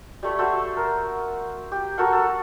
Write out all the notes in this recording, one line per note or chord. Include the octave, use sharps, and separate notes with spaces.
G3 A3 C#5
F#4 A4 C5 E5
A#4
G4
F#4 A4 A#4 F#5
A4